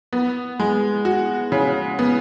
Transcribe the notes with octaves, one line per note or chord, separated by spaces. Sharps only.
B3
G#3
F#4
C#3
B3